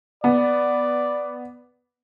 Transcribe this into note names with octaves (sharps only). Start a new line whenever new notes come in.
B3 D5